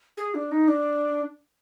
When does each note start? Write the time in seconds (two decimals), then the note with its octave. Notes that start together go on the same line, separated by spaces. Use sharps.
0.17 G#4
0.34 D4
0.52 D#4
0.68 D4